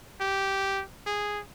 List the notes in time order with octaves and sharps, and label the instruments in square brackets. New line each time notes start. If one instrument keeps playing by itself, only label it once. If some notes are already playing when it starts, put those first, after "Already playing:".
[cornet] G4
G#4